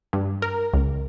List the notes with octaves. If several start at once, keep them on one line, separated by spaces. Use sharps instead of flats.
G2
A#4
C#2